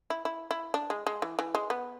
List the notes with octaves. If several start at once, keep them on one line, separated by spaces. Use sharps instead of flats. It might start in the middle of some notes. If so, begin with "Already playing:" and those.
E4
E4
E4
D4
G#3
G#3
E3
E3
G#3
B3